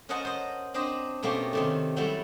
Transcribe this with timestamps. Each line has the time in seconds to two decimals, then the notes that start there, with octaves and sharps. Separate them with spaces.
0.09 C#4 A#4 C5 D#5 F#5 A5
0.25 C5 D#5
0.74 C4 D4 C5 D#5 B5
1.23 B2 A3 A#3 C4 C#4 G4
1.53 C3 D#3 A3
1.96 F#3 G3 A3 E4 A4